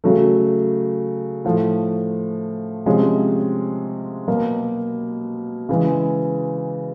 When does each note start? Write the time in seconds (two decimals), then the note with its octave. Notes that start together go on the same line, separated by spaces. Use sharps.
0.04 C#3 F#3 A3
1.45 A2 F3 A3
2.86 C3 F3 G#3 C#4
4.28 B2 F#3 A#3
5.69 C#3 E3 G#3